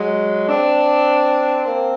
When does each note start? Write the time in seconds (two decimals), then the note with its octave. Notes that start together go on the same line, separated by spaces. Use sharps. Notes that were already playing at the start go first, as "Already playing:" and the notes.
Already playing: F#3 G#3
0.48 C4 D4
1.64 A#3 C4